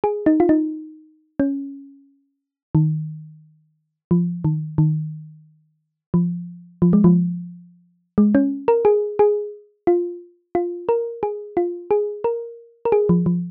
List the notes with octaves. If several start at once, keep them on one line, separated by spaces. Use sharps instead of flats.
G#4
D#4
F4
D#4
C#4
D#3
F3
D#3
D#3
F3
F3
G#3
F3
G#3
C#4
A#4
G#4
G#4
F4
F4
A#4
G#4
F4
G#4
A#4
A#4
G#4
F3
F3